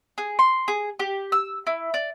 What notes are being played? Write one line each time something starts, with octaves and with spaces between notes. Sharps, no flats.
G#4
C6
G#4
G4
E6
E4
D5